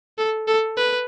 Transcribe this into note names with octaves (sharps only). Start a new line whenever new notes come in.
A4
A4
B4